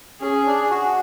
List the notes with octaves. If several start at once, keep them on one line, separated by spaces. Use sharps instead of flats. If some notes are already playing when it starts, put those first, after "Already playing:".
C#4 G#4
D4
F#4